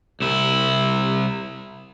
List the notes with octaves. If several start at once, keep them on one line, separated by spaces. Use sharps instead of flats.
C2 E4